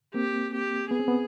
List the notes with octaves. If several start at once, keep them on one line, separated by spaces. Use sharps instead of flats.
A#3 C4 G4
G4
B3 G#4
C4
B3